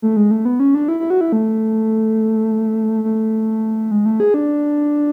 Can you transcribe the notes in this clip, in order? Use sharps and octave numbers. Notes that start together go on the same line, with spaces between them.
A3
G#3
A3
B3
C#4
D4
E4
E4
F#4
E4
A3
A3
G#3
A3
G#4
D4